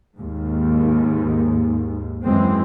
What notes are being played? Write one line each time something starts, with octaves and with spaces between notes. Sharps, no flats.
D#2 G#2
F#2 E3 G#3 C4